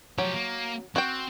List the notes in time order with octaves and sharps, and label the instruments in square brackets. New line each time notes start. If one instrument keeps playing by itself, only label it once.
[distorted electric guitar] F3 G4 [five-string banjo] F#3
[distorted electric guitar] A#3
[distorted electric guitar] C4 [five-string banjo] F#4 F#5 G5